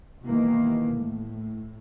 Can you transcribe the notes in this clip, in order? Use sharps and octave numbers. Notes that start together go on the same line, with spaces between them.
B2 D#3 E3 A#3
A2